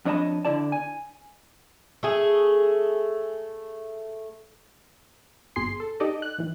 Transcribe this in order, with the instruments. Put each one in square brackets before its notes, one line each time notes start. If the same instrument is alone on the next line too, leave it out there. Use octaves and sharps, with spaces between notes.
[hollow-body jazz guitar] F2 D4 C#5 D#5 A5 B5
D3 E4 D5 A5
G#5
[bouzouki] A3 G#4
[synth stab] G1 B2 G#4 C6 C7
A4
D#4 G4 A4 D5 D#5
F#6
D#3 E3